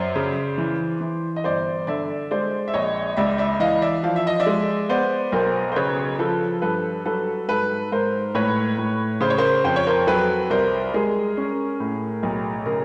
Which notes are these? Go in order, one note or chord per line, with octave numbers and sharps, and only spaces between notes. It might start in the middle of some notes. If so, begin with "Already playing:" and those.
Already playing: F#2 C5 D5
C#3
E3
E3
D#5
G1 C5 D5
D3 D5 E5
G#3 C5 D5
E5
A#1 C#5 D#5
C#2 D5 E5
D5 E5
E3 D#5 F5
D5 E5
F3 F5
E5
D#5
D5 E5
G#3
B3 C5 D5
B1 A#4 C5
C5
C#3 B4 C#5
F3 A4 B4
G2 A4 B4
F#3 A4 B4
G#2 A4 B4
G#2 A#4 C5
A2 B4 C#5
A2
C#3 C5
C#5
A#4 C5
F2 C5
C#5
A#4 C5
F#3 A4 B4
C2 A#4 C5
G#3 G#4 A#4
C#4
A2
B1
C#3 G#4 A#4